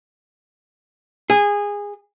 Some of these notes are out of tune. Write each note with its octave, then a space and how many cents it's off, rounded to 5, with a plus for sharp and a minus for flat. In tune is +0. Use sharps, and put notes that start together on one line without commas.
G#4 -20